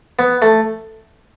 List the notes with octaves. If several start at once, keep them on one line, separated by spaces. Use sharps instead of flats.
B3
A3